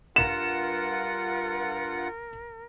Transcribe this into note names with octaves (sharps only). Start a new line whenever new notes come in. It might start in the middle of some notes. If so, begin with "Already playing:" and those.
G2 F4 A#4 F#5 E7